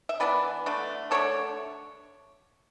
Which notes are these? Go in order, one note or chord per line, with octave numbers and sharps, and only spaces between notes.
E5
E3 B3 D4 B4 D5
D3 A3 D4
D3 A3 D4 A4 C#5